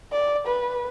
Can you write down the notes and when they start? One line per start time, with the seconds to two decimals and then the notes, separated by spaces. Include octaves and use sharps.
0.12 D5
0.47 B4